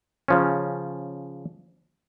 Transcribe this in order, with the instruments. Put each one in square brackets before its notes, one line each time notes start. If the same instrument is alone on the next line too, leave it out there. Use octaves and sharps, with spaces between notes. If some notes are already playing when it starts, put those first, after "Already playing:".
[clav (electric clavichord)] C#3 F3 C#4